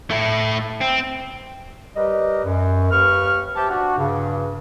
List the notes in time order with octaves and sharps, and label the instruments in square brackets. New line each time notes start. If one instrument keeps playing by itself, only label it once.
[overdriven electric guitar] A3 E4
C4
[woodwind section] G3 G4 A#4 B4 D#5
F#2
D#2 G4 B4 C#6 F6
G4 C5 E5 G5 A5
D4 F#4
G2 C#3